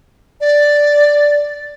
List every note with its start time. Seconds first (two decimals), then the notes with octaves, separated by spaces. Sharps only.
0.41 D5